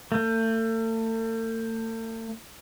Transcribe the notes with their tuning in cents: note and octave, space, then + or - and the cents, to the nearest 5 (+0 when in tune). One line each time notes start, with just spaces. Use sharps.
A3 +40